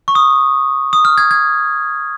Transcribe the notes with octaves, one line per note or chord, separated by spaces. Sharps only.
C#6
D#6
D#6
F6
G#6
G#6